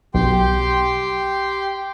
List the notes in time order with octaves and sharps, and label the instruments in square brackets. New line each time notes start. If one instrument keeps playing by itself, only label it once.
[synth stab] B1 [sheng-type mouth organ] G4 G5 C6